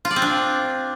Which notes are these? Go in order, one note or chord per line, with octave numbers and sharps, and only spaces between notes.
F4
D5
C4
D4